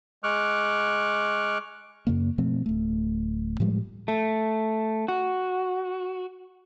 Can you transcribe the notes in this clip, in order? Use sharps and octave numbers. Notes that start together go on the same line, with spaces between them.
G#3 C#6 D6 F6 F#6
F#2 C#3 A#3
B2 F3 A3 C4
D1 A3
A2 F3 G3 G#3
A3
F#4